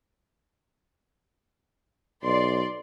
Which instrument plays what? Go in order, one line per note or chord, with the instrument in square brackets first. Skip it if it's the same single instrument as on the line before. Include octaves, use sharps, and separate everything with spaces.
[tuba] B1 [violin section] D5 C6